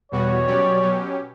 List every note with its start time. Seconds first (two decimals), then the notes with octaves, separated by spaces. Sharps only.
0.11 E2 B2 G3 B3 F#4 C#5
0.47 B2 F#3 C#4 G4 D5
0.82 B2 F#3 C#4 G4